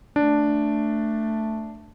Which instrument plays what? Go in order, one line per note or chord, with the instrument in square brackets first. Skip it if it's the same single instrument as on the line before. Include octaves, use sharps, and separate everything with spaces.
[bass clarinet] A3 [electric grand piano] D4